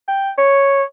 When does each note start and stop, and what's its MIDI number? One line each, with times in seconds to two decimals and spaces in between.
0.08 0.30 79
0.38 0.83 73